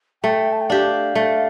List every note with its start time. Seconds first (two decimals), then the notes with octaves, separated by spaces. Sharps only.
0.23 A3 G5
0.53 A5
0.61 G5
0.69 D4 G4 F5
1.15 A3